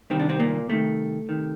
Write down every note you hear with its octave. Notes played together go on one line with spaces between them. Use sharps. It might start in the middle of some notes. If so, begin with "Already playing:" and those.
C2 C3 D#3 C4
D4
C3 C4
A#2 A#3
C2 C3 D#3 A3
C3 D#3